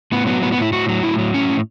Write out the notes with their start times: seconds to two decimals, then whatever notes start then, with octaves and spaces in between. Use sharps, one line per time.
0.12 A2 B3
0.27 F#3 B3
0.42 A2 B3
0.52 B3
0.58 A2 E4
0.73 A2 F#4
0.89 F#3
1.03 A2 E4
1.19 F#3
1.34 A2 C#4
1.49 A2